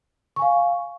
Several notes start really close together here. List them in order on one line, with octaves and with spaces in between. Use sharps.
C#6 G#5 F5